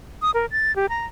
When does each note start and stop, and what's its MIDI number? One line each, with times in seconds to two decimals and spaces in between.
0.22 0.31 87
0.34 0.46 70
0.52 0.74 93
0.76 0.89 67
0.89 1.06 82